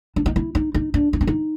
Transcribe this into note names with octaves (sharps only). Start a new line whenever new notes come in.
D4
D#4
E4
D#4
D#4
D4
D#4
D4
D#4